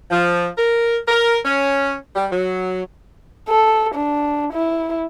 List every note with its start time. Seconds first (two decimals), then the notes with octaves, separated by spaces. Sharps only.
0.11 F3
0.58 A#4
1.08 A#4
1.44 C#4
2.15 G3
2.31 F#3
3.49 A4
3.95 D4
4.53 E4